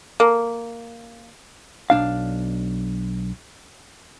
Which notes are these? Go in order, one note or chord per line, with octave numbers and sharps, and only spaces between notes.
A#3
B1 D4 F5